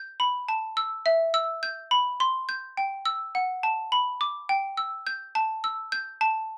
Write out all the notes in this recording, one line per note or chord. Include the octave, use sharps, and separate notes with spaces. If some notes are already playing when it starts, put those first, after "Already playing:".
Already playing: G6
B5
A5
E6
E5
E6
G6
B5
C6
G6
G5
E6
F#5
A5
B5
D6
G5
E6
G6
A5
E6
G6
A5